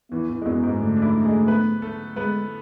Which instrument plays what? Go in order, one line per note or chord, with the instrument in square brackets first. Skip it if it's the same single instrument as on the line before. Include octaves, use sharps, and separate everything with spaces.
[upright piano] E2 E3 [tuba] B3
[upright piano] E2 E3
G#3
[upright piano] F#2 F#3 [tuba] B3
[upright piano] G#2 G#3
[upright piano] D3 D4 [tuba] A3
[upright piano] D4
E3 E4
G#3 G#4
B3 B4
A3 A4
[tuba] G#3 [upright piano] B3 B4